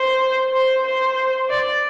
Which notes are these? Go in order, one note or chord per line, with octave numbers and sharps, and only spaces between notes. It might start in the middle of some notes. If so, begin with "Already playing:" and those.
Already playing: C5
C5
C5
D5